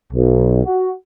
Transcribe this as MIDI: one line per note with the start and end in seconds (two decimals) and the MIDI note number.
0.11 0.62 35
0.64 0.91 66